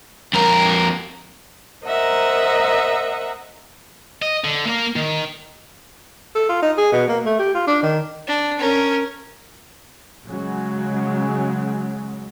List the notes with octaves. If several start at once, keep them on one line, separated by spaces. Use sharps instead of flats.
F2 A#4
A#4 C5 D#5 E5 F#5 A#5
D#5
D3
A#3 A#4
D#3
A4
F4
D#4
G#4
B2
A#3
A3
G4
F4
D4
D#3
D4
C#4 A#4
C#3 F#3 G#3